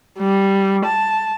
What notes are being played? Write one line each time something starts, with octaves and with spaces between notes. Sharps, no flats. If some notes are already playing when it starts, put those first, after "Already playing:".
G3
A5